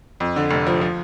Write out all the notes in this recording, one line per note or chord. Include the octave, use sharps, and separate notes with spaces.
F2
D3
F1
F3
F3